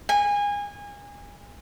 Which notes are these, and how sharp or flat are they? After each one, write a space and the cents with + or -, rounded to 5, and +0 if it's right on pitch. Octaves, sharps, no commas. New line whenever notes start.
G#5 -25